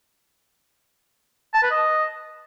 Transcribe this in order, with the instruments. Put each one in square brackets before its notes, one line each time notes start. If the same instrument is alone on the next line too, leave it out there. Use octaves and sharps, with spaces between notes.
[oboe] A5
B4
D#5